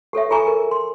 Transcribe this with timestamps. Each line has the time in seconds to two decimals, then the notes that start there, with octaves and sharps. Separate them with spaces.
0.13 G4 A4 C#5 E5
0.31 F4 G#4 A4 G#5 A#5 C#6
0.47 A#4
0.71 C6